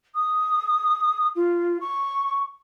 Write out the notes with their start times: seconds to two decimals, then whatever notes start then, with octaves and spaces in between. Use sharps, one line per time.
0.15 D#6
1.36 F4
1.81 C#6